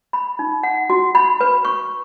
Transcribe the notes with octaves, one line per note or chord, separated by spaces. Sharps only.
B5
D#4
F#5
F#4
B5
B4
C#6